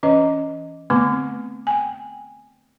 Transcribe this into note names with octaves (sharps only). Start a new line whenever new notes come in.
E3 C#4 B4 D#5
D3 A3 B3 C4 C#6 D6
G5 G#5